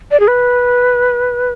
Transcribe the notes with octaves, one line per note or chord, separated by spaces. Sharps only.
D5
G#4
B4